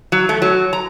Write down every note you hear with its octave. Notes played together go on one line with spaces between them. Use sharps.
F#3
A3
F#3
A#5